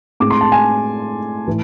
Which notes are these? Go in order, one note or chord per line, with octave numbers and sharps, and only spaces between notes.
A2 G#3 C4 D6
C6
A5
G#5
A2 E3